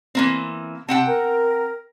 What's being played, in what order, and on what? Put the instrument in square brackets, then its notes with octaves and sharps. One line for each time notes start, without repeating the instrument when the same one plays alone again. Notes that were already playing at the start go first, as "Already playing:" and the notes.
[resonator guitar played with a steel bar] E3 A#3 C4
[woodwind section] C3 A5 [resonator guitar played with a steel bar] C4 F#5 G5
[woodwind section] A#4